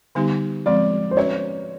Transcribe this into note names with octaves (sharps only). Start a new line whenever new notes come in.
D3 G3 B3 D#4 G4
F3 G#3 C4 D5
C5
C#4 F#4 B4 C#5 E5